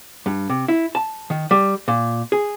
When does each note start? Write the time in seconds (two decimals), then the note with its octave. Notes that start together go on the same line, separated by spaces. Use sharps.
0.26 G2
0.49 C3
0.68 E4
0.95 A5
1.30 D#3
1.51 G3
1.88 A#2
2.32 G#4